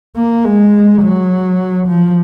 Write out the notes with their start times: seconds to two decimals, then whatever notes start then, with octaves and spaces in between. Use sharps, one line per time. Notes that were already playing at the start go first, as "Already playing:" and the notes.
0.16 A#3
0.44 G#3
1.02 F#3
1.88 F3